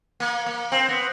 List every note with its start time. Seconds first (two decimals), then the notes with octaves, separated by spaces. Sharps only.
0.20 A#3
0.46 A#3
0.72 C4
0.89 B3